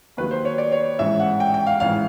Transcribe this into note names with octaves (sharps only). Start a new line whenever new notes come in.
D#2 D#3 F#3 B4
C5
C#5
D5
C#5
A1 G#2 E3 E5
F#5
G5
G5
F5
A1 G#2 E3 F5